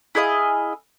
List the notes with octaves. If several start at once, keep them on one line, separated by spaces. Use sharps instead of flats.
E4 G#4 D#5 F5